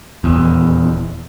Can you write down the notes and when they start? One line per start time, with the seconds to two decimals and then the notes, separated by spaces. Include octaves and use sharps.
0.24 D#1 E2